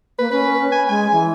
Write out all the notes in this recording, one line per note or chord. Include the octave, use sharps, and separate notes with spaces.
A#3 B4
C#4 B4
G#5
G#3 G#5
E3